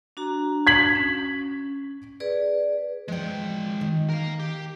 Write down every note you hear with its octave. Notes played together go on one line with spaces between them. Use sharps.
D4 F#4 A#5
G#6 B6 F#7
C#4
G#4 B4 D5
F3 G#3 C#5 G5
D#3
A#4 F5
G4